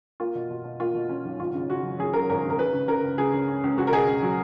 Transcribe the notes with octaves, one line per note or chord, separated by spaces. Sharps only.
A#3 F4
B2
B2
B2
A#3 F4
B2
C#4
B1
G#1 F4
C#3
C#3 F#4
F#2
F#2 G#4
C#3 A#4
G#1 A#4
C#3
A#4
C#3 B4
C#3
C#3 A#4
C#2
C#3 G#4
C#3
C#3
C#2
C#2 F#4
A#4
B2 G#4
C#2
F#3